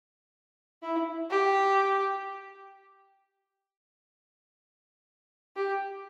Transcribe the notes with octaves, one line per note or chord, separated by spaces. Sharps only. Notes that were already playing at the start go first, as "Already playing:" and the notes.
E4
G4
G4